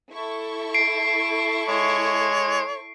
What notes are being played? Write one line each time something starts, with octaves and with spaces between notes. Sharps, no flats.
E4 A4 C#6
C7 D7
G#3 C#5